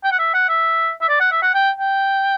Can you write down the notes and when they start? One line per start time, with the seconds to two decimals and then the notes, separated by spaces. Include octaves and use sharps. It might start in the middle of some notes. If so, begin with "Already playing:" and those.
0.04 G5
0.12 F#5
0.19 E5
0.34 F#5
0.49 E5
1.02 E5
1.09 D5
1.20 F#5
1.32 E5
1.42 F#5
1.55 G5
1.77 G5